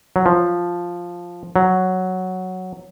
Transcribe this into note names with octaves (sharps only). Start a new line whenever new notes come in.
F#3
F3
F#3